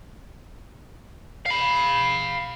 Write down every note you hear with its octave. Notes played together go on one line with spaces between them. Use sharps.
F5 B5